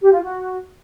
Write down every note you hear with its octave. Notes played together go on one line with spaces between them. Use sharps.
G4
F4
F#4